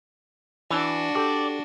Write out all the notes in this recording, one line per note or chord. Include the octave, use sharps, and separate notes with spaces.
E3 D4 F#4
G4 A4 D5